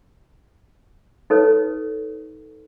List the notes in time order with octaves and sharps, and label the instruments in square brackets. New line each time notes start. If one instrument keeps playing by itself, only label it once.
[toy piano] D#4 A4 B4 C#5